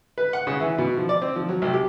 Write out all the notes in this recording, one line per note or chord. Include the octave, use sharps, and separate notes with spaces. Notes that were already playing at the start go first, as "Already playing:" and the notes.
B4
F#5
C#3
E3
B2
F3
D5
C4
F3
F#3
C2
G4